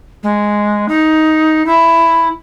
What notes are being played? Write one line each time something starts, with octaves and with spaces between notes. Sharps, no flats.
G#3
D#4
E4